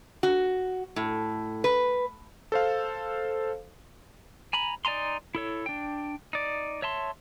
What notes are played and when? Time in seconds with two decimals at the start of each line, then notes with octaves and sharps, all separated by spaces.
0.23 F#4
0.96 A2
1.64 B4
2.52 A4 C5 F5
4.53 G#5 A#5 B5
4.85 D#4 D5 G#5 A#5 C6
5.35 E4 A4 C#5
5.66 D4 G5
6.33 D#4 D5
6.82 C#5 E5 A5 C6